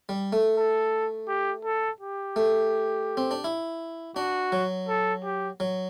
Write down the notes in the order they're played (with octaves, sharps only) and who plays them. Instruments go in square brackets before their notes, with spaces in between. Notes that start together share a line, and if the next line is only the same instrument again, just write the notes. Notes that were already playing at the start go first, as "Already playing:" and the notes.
[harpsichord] G3
A3
[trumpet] A4
G4
A4
G4
[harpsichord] A3
C4
D4
E4
[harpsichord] D4 [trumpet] F#4
[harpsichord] F#3
[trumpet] A4
G4
[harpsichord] F#3